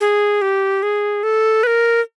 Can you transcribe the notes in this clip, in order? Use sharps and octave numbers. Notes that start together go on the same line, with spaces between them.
G#4
G4
G#4
A4
B4
A#4